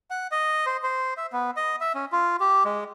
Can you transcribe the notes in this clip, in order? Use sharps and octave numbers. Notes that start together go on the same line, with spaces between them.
F#5
D#5
C5
C5
E5
B3
D#5
E5
C#4
F4
G4
G#3